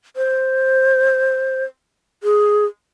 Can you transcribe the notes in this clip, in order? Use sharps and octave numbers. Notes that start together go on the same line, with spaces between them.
C5
G#4